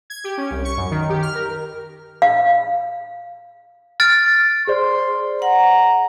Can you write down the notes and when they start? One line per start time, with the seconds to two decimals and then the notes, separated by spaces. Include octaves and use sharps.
0.10 G#6
0.24 G4
0.37 C#4
0.51 C2
0.65 C#6
0.77 F#2
0.91 D#3
1.09 G4
1.22 F6
1.35 A#4
2.22 F5
4.00 F6 A6 D7
4.67 G#4 C5 D5 C6
5.42 F#5 A#5